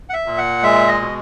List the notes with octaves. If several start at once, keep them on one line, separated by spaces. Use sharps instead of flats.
F#5
E5
A#2
F#5
G#3 E5
D#5
B2